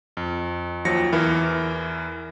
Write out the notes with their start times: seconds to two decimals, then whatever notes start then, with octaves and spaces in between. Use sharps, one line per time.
0.17 F2
0.85 D#2 F3 F#3 A#6 C#7
1.12 E2 E3 E4 A#4